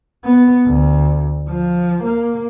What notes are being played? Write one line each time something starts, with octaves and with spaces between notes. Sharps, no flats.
B3
D2
F3
A#3